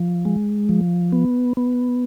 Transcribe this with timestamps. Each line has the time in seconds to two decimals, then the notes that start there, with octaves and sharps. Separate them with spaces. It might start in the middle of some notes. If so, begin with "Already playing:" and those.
Already playing: F3
0.25 G#3
0.69 F3
1.12 B3
1.57 B3